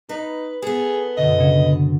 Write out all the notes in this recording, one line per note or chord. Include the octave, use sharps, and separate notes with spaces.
D#4 B4
B3 G#4 A4
F#2 B2 D3 D#5
C#3